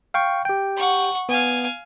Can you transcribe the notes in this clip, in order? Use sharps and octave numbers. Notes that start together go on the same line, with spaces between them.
F5 G5 C#6
G4 G5
F#5 C#6
B3 F5 G#5